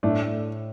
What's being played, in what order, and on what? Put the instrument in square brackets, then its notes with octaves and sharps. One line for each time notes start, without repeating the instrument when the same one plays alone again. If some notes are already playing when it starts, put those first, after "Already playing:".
[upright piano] A2 [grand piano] A3 D4